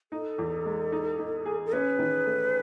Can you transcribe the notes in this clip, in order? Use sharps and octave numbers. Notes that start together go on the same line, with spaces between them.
D#4 A4
E2
G#3
D#4
D#4
G#4
A4
C#4 B4
D#3
A3